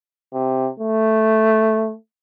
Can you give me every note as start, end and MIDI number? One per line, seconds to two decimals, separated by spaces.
0.33 0.69 48
0.80 1.94 57